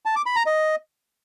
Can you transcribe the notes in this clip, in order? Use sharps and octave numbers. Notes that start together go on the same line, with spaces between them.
A5
D6
B5
A#5
D#5